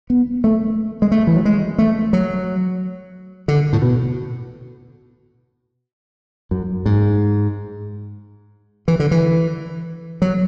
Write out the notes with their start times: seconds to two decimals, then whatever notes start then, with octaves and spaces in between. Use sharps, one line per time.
0.10 B3
0.44 A3
1.02 G#3
1.12 A3
1.27 E3
1.36 F#3
1.45 G#3
1.79 A3
2.13 F#3
3.48 D3
3.73 A2
3.82 B2
6.51 F#2
6.86 G#2
8.88 E3
9.00 D3
9.11 E3
10.22 F#3